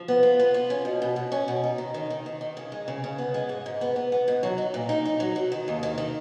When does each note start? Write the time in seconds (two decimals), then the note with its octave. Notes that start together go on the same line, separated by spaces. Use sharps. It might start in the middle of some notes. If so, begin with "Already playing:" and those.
Already playing: F3
0.08 B3
0.23 F4
0.39 B3
0.54 F4
0.70 C#4
0.85 B2
1.02 B2
1.16 B2
1.32 C#4
1.48 B2
1.64 D#4
1.78 D#3
1.94 D#3
2.10 D#3
2.26 D#3
2.41 D#3
2.57 C#3
2.72 G#3
2.88 C#3
3.04 C#3
3.18 B3
3.34 G#3
3.49 G#2
3.66 G#2
3.81 B3
3.96 B3
4.12 B3
4.28 G#2
4.43 F#3
4.58 D#4
4.74 A#2
4.89 D#4
5.05 D#4
5.20 F#3
5.36 F#3
5.52 D#3
5.68 D#2
5.83 D#3
5.98 D#3